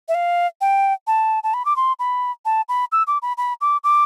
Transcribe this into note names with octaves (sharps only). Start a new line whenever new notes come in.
E5
F5
G5
A5
A5
B5
D6
C6
B5
A5
B5
E6
D6
B5
B5
D6
D6